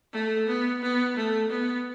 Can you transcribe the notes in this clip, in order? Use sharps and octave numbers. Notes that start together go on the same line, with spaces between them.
A3
B3
B3
A3
B3